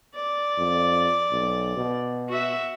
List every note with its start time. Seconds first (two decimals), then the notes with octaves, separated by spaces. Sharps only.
0.15 D5
0.58 F2
1.32 B1
1.78 B2
2.29 F#4 E5